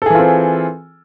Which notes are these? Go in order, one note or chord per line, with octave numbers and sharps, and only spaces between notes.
E3 C4 F4 G#4 A4